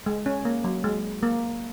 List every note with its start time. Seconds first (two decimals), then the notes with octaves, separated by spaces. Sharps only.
0.06 G#3
0.26 C#4
0.45 A#3
0.64 F#3
0.84 G#3
1.23 A#3